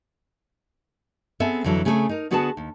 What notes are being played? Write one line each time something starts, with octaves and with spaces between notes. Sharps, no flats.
B3 C4 G#4 A4 E5
F2 D3 E3 F#3 A4
C#3 A3 C4 D#4 G#4 A4
D#4 A#4
D3 B3 F#4 G#4 B4 A5
D#2